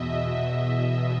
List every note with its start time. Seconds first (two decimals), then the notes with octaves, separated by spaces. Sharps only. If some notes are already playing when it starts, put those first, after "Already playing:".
Already playing: E2 B2 D#5 E5
0.21 D#5
0.67 D#5